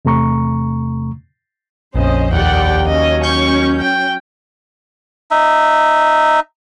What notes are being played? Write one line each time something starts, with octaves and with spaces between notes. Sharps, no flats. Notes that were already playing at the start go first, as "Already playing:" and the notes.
E2 C3 A3 A#5 C#6
A#1 F2 C#4 C5 D#5
D#2 G4 D5 F#5 G5
F#3 C#4 D#5
C#6 G6
G5
D#4 E5